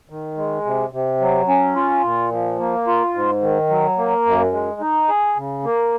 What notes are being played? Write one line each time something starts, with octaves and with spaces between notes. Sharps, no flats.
D#3
G#3
C3
C3
F#3
C#4
F4
A#2
F3
A#3
F4
G#2
D#3
F#3
A#3
F#2
G#3
D#4
G#4
C#3
A#3